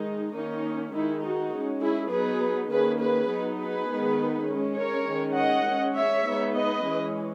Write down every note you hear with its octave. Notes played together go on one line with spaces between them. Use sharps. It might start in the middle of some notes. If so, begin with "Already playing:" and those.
Already playing: D#3 G#3 D#4
D#3 A#3 C#4 D#4
D#3 G#3 D#4 E4
D#4 F#4
G#3 C#4
E4 G#4
F#3 B3 D#4 G#4 B4
D#3 A#3 C#4 G#4 B4
G#4 B4
F#3 B3 D#4
G#4 B4
D#3 G#3 B3 D#4
G#3 C#4
A#4 C#5
D#3 G#3 C#4
D#5 F#5
G#3 C#4
C#5 E5
G#3 B3 D#4
B4 D#5
E3 G#3 C#4